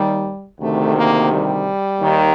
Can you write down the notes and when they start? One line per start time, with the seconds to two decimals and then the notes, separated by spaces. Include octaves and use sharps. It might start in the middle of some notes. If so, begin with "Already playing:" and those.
Already playing: D#2 D#3 G3
0.60 D2 C3 D#3 A3
0.96 A#3
1.30 G3
2.00 D#2 D#3